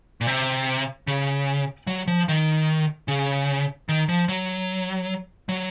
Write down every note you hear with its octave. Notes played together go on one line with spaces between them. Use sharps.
A#2
C3
C#3
F#3
F3
D#3
C#3
D#3
F3
F#3
F#3